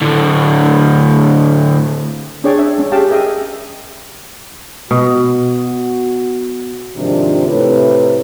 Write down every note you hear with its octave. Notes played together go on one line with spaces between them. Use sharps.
D2 A2
C#4 D4 G#4 C#5 D5 G5
E5
G#3 C#4
G4 G#4 F5 G5 A5
G#4 A#4 D#5 E5 G5
B2 F#4
G#2 C3 D#3 F3 D4
A2 C3 A3 E4 B4 C#5